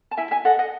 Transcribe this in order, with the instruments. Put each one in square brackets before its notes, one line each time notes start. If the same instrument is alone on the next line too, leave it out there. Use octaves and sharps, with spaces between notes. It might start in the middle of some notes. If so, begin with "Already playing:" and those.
[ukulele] A5
E4 E5 G#5
E5 G#5
A4 D#5 F#5
D#5 F#5